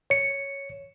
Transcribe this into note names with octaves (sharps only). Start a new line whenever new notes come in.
C#5 C#7